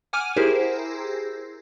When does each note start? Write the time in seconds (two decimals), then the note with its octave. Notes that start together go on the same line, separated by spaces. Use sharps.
0.13 F#5 G#5 D6 F6 D#7
0.37 E4 G4 G#4 A#4 C5